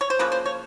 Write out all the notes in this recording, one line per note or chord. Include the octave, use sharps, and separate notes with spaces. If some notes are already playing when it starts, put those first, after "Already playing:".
C#5
C5
C#3 F3 A#3 B4
C5
C#5